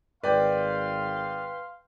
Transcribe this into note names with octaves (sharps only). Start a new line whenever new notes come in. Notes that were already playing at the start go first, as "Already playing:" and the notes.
G#1 B4 D5 F5 G5 C6